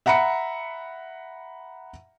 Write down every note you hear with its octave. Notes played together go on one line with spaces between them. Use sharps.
E5 F#5 A#5 B5 C#7